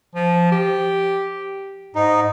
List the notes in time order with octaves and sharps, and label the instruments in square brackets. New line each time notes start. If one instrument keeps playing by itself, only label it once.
[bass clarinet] F3
G4
[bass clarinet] G#2 [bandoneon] D#4